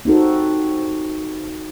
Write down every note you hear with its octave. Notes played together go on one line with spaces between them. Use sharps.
C4 D#4 F#4 A4